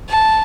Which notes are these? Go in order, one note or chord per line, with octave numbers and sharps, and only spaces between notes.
A5